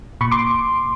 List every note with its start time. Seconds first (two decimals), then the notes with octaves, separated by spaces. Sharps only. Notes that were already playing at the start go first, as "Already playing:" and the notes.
0.21 A#2 B5 C#6
0.31 C6 D6